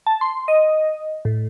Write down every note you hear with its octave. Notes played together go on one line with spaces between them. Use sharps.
A5
C6
D#5
A2